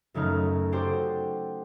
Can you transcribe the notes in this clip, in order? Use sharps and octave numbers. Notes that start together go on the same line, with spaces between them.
F#2 C#3 A3 D#4 F6
F#4 G4 A4 C5 D5 G5